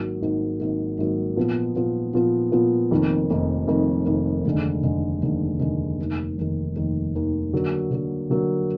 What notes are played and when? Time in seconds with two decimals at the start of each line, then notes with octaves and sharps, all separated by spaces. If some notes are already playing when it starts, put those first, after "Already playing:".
Already playing: G#1 G#2 F#3 A#3
0.21 G#1 G#2 F#3 A#3
0.60 G#1 G#2 F#3 A#3
0.98 G#1 G#2 F#3 A#3
1.36 A#2 F3 B3 F4
1.75 A#2 F3 B3 F4
2.14 A#2 F3 B3 F4
2.52 A#2 F3 B3 F4
2.91 F1 F2 D#3 A#3 D#4
3.30 F1 F2 D#3 A#3 D#4
3.67 F1 F2 D#3 A#3 D#4
4.06 F1 F2 D#3 A#3 D#4
4.44 F1 D#2 D3 G#3
4.83 F1 D#2 D3 G#3
5.22 F1 D#2 D3 G#3
5.60 F1 D#2 D3 G#3
5.98 F1 D#2 D#3
6.37 F1 D#2 D#3
6.76 F1 D#2 D#3
7.14 F1 D#2 D#3
7.53 D3 F#3 A#3
7.91 D3 F#3 A#3
8.30 D3 F#3 A#3